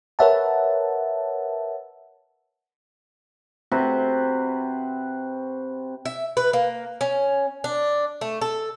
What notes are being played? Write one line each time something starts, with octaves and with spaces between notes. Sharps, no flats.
A#4 B4 C#5 E5 F#5 A5
C3 C4 F#4 B4
E5
B4
A#3
C#4
D4
A3
A4